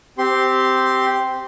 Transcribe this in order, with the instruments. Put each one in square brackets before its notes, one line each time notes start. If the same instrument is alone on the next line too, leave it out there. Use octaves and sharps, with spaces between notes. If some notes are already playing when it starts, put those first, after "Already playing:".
[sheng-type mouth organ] C4 G4 C6